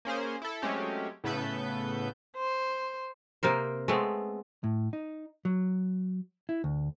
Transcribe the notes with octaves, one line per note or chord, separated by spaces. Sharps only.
A#3 C#4 G#4 C5
E4 A4
F#3 G#3 A3 C4 C#4 G4
A2 C#3 B3 A4 B4 G6
C5
C3 A#3 A#4 C5
G#3 A3 B3 C4
A2
D#4
F#3
E4
D2